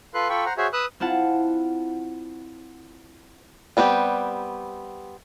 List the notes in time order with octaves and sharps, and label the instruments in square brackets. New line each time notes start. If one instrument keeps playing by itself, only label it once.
[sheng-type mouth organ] F4 A4 B4 C6 F#6
F4 A4 G5 B5 C#6
C5 F#5 A#5
F#4 G#4 C5 C#5 E5
B4 D#6 E6 F#6
[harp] C4 E4 F4 F#5 A5
[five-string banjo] G3 B3 C4 G4